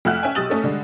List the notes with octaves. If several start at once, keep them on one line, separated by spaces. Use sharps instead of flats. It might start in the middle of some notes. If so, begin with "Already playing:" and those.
F2 A3 E5 F#5 F6 F#6
C#4 E5 G5 G#5
B1 G4 D#6 E6 A6 F#7
A3 C#4 A4
D3 G3 G#3